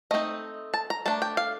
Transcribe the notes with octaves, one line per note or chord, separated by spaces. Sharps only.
A3 C4 D#4 D#5
A5
A#5
A3 D4 A5
G5
F5